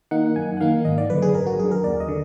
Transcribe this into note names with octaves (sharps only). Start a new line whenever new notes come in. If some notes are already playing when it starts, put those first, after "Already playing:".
D#3 A#3 D#4 F#5
F#2 G#5
F#5
D#3 A#3 D#4 F5
G#1 D#5
D5
F#2 D3 B4
G#4
G#1 A#4
F#4
F#2 D3 G#4
A#4
D#2 D5
D#5
D3